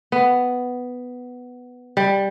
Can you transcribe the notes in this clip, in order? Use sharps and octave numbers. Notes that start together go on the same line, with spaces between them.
B3
G3